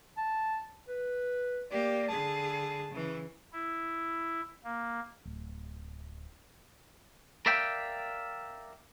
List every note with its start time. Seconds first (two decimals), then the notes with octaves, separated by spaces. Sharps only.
0.17 A5
0.88 B4
1.71 A#3 G4 D5
2.08 D3 G#4 A5
2.91 C#3 E3
3.53 E4
4.64 A#3
5.25 D1
7.46 A#4 D5 E5 F5 G5